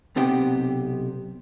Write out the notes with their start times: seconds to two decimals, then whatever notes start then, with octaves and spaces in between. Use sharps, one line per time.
0.16 B1 C3 B3 G4 G5